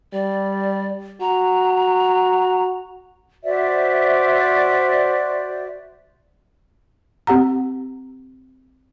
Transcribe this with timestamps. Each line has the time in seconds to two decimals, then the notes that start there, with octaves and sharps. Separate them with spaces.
0.13 G3 D5
1.21 F#4 A#5
3.44 F#4 C5 D5 E5
7.27 C4 G4 F#5 A#5